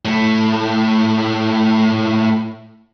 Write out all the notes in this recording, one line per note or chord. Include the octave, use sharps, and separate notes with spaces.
A2 A3